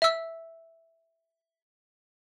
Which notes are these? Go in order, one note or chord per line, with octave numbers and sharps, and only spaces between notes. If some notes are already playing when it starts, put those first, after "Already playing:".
E5 E6